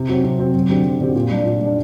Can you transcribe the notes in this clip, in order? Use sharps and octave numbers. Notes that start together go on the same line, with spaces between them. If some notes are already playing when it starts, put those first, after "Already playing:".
Already playing: C3
F#3 C4
C3
F#3 C4
F#2
D3 F#3 C4 G4
F#2
D3 F#3 C4 G4
A#2
G3 D4
A#2
G3 D4